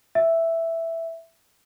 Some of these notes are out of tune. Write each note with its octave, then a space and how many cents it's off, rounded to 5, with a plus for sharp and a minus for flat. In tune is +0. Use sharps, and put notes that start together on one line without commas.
E5 +0